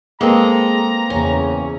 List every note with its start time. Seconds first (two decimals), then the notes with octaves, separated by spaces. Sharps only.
0.21 G#3 A#3 C4 A4 B4 A#5
1.10 E2 C#3 C#4